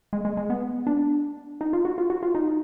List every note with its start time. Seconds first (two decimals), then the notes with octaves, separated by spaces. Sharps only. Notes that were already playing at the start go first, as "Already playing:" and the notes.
0.13 G#3
0.25 G#3
0.37 G#3
0.50 B3
0.87 D4
1.61 D#4
1.73 F4
1.85 F#4
1.98 F4
2.10 F#4
2.23 F4
2.35 D#4